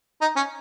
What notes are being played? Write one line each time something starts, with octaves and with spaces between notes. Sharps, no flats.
D#4
C#4